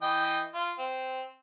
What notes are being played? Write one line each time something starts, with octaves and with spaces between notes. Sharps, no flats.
E3 D#5 G5
F4
C4